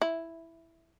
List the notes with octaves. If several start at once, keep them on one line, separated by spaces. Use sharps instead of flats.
E4